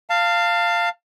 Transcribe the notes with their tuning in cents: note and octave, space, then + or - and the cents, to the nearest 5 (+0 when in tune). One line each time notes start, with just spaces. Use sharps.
F5 -5 A5 +30